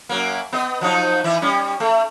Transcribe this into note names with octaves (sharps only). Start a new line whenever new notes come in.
F#2 F#3 A#3
B3 D#5
F3 F#3 D#4
E3 E4
G3 C#4
A3